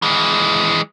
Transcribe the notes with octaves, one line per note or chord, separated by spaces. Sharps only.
E3 G#3